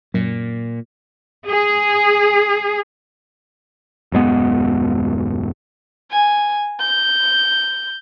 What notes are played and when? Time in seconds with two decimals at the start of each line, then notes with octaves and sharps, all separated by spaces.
0.14 F#2 A#2
1.50 G#4
4.12 D#1 F#2 G#3 B3
6.11 G#5
6.81 G6